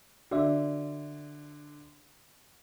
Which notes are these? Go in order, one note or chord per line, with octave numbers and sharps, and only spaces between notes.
D3 F#4 D5 E5